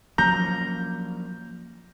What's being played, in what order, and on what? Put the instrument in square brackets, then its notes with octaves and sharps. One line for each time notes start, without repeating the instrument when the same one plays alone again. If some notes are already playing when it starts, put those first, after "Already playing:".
[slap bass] F3 A#3 C#4 [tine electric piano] F#3 [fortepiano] A#5 [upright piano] G6